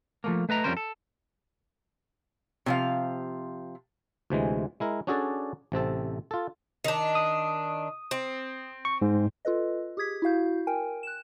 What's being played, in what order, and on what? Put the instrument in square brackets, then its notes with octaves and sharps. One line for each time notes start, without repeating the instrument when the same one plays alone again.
[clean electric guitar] F3 A3 A#3
A3 B4 D#5 A#5
F2 G3 C#4 A#4 C5
A4
[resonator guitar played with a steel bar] C3 F3 F5
[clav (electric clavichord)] D2 C3 E3 G#3
G#3 E4 A#4
C#4 D4 F#4 G#4 A4 D5
A1 C3 C4 A4
F4 A4
[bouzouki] D#3 D4
[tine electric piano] D#6
[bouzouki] C4
[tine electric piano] C#6
G#2
[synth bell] F4 A4 B4 D#5
G4 G#4 D#6 G#6 B6
E4 F#4 F5 G6
A#4 G5 G#5
F#6 E7